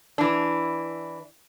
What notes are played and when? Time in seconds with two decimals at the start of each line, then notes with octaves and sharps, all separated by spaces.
0.18 E3 D4